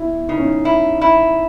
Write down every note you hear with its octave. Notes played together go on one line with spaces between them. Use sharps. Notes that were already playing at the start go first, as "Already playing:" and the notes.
Already playing: E4
C#3 D#4
C#4
D#4
E4
E4